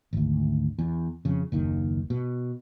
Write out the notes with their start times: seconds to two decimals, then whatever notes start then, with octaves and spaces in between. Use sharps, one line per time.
0.13 G#1 D2
0.79 E2
1.25 F2 C#3
1.52 F#1 D#2 D#3
2.10 B2